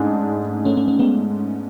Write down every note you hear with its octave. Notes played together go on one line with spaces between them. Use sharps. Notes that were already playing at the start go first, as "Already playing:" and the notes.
Already playing: G#2 G#3 A3 C#4 D4
A3 C#4
A3 C#4
A3 C#4
G#3 B3